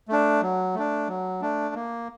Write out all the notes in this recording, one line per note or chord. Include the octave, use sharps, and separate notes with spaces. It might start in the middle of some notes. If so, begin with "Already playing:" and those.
A3 D4
F#3
A3 D4
F#3
A3 D4
A#3